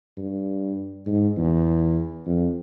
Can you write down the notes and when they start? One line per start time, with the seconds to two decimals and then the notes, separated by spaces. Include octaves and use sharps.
0.18 G2
1.07 G#2
1.38 E2
2.27 F2